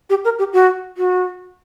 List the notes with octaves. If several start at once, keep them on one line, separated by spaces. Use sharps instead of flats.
G4
A#4
G4
F#4
F#4